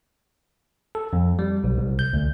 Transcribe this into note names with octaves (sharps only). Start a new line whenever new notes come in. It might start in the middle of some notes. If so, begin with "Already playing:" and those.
A4
F2
G3
B1
C2
G6
D2